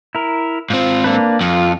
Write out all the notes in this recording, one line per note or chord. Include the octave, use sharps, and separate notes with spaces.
E4 A#4
G#2 C4 F4
A#3 D4 B4
F2 F4